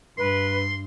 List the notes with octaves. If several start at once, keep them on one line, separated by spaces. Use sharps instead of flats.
G2 B4 C6